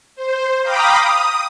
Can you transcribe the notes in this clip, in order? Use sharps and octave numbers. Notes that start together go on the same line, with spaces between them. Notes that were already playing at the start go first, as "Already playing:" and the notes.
C5
F5 G5 A#5 B5 D6 D#6
D#6